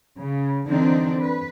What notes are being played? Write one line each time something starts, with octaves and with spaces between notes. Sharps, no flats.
C#3
D3 E3 C4 D4 D#4
B4